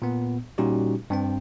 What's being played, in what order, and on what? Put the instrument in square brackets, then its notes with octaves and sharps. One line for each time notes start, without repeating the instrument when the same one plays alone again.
[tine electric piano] A#2 B3
A#2 G3 C#4 D#4 F#4 G4
G2 C4 G5